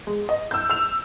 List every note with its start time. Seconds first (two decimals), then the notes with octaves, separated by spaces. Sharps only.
0.07 G#3
0.29 D#5
0.51 E6 G6
0.70 E6 F7